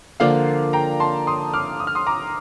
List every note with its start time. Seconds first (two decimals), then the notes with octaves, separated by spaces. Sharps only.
0.20 D3 F3 A#3 F4 D5 F5
0.73 G5 A#5
1.00 A5 C6
1.27 C6 D#6
1.54 D6 F6
1.80 D#6
1.87 F6
1.95 C6 D#6
2.07 A#5 D6